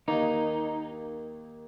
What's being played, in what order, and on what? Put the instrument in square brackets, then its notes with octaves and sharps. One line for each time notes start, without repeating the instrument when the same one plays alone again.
[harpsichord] D#2 D#3 A#3 [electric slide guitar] D#4